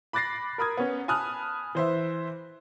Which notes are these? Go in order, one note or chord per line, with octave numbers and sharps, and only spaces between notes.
B5 D6 F#6 A6 A#6 C7
A#4 B5 D#6 G#6
B3 C#4
G#5 A5 B5 D#6 F6 F#6
E3 C5 E5